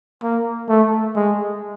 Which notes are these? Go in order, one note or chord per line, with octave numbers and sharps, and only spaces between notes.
A#3
A3
G#3